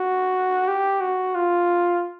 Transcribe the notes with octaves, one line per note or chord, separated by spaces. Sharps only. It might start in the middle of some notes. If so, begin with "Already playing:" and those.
Already playing: F#4
G4
F#4
F4